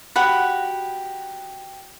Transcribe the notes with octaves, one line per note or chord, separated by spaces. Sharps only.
F#4 G4 F#5 B5